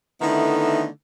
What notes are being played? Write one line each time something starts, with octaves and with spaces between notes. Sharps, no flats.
D3 D#3 A3 B3 D#4 E4